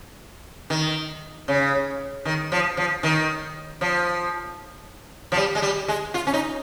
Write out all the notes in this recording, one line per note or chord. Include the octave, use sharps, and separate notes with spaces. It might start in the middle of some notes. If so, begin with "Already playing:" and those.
D#3
C#3
D#3
F3
F3
D#3
F3
F3
G3
G#3
G3
G#3
F4
C#4
D#4